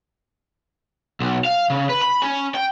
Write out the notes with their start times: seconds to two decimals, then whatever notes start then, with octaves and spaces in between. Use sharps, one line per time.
1.21 B1
1.44 F5
1.70 C#3
1.89 B4
2.02 B5
2.22 C#4
2.55 G5